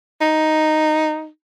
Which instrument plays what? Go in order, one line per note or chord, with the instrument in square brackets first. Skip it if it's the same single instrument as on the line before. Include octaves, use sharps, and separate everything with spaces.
[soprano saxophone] D#4